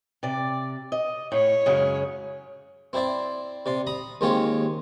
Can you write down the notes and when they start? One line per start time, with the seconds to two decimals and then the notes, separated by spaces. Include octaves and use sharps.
0.23 C3 D5
0.92 D#5
1.32 A2 C#5
1.66 F#2 C#3 G#3
2.93 C4 E4 C5 D5 E5
3.66 C3 D5 C6
3.87 A#5 B5 D#6
4.21 D#2 G#3 C4 F4 G4 C#5